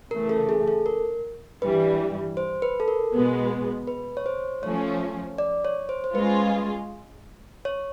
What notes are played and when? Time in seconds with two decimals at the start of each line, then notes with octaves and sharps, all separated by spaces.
0.11 C#3 E3 A3 A#4
0.29 A4
0.49 G#4
0.68 A4
0.86 A#4
1.62 G2 E3 G3 B4
2.37 C5
2.62 B4
2.80 A4
2.88 A#4
3.13 B2 G#3 B3
3.87 B4
4.17 C#5
4.26 C5
4.63 F3 A3 C#4 C#5
5.38 D5
5.65 C#5
5.89 C5
6.04 C5
6.15 G#3 C#4 F4 G#4 B4
7.65 C#5